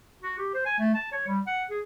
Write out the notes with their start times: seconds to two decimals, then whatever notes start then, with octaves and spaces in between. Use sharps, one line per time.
0.22 F#4
0.38 G4
0.54 C5
0.66 G#5
0.79 A3
0.95 A5
1.12 C#5
1.27 G3
1.47 F#5
1.70 G#4